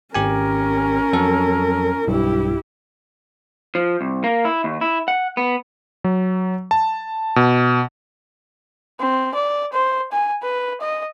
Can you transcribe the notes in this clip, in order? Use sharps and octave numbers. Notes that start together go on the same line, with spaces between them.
G#1 C#4 G4 A#4 G#5
F2 F#3 A4
B1 G2 E4 G4
F3
C2
A#3
E4
D#2
E4
F#5
B3
F#3
A5
B2
C4
D5
C5
G#5
B4
D#5